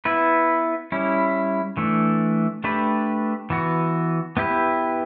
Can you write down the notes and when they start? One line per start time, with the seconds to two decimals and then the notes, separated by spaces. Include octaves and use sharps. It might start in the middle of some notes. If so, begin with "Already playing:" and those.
0.05 B3 E4 B4
0.92 G3 C#4 E4
1.77 E3 A3 D4
2.64 A3 D4 G4 B4
3.50 E3 B3 F#4
4.37 B3 E4 G4 B4